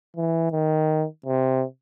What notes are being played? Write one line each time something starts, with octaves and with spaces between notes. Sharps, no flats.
E3
D#3
C3